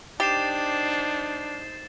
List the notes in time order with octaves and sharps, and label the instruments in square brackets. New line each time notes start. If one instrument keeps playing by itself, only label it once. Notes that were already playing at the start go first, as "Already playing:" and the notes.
[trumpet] D4 [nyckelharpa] D#4 C5 [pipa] G4 [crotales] A6 C7 E7